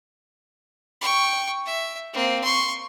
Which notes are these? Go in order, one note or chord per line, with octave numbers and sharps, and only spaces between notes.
G5 C#6
E5
A#3 C4
C6 C#6